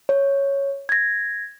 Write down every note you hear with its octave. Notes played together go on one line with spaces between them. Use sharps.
C#5
G#6 A#6